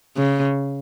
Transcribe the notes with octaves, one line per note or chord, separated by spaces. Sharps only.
C#3